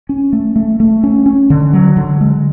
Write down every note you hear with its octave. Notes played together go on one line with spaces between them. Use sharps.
C#4
A3
A3
A3
C#4
C#4
D3
F#3
D3
G#3